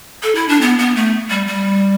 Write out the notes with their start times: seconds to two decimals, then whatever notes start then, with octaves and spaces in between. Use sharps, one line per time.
0.23 A4
0.35 E4
0.49 D4
0.61 B3
0.79 B3
0.96 A3
1.30 G3
1.47 G3